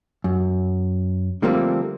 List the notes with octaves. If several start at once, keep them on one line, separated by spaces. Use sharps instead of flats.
F#2
D3 F3 G3 A3 A#3 C4